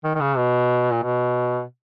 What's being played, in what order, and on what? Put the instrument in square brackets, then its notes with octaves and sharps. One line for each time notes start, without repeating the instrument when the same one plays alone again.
[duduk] D#3
D#3
C#3
B2
A#2
B2